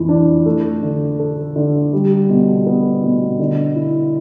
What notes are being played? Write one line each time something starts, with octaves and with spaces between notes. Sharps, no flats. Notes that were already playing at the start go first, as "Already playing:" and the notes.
Already playing: F2 E3
D4
A3
D3
A4
D3
G3
B2
B3
B2
D3
E4